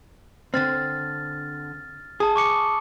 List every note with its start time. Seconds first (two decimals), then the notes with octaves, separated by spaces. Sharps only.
0.54 D3 C4 F6 A6
2.20 G#4 A5 D#6
2.36 C#6 D6 C#7